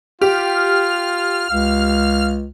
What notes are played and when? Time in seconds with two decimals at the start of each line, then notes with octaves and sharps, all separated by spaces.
0.21 F4 G4 F6
1.50 C#2 F5